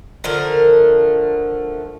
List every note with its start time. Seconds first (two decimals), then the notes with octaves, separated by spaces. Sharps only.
0.24 D3 F3 A3 A#4